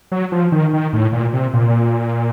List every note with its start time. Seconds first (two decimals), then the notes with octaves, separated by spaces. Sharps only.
0.12 F#3
0.32 F3
0.52 D#3
0.73 D#3
0.93 A2
1.13 A#2
1.33 C3
1.54 A#2